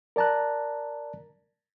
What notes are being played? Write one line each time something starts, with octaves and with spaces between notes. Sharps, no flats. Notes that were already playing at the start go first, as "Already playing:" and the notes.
A#4 D5 A5 A#5 F#6